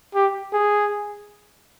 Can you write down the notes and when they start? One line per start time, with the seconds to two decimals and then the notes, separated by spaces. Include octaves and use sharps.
0.15 G4
0.53 G#4